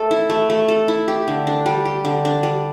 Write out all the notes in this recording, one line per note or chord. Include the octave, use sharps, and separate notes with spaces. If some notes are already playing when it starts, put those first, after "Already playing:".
Already playing: A3 A4
E4
A3
A3
A4
E4
G4
D3
D4
G3
G4
D3
D4
G3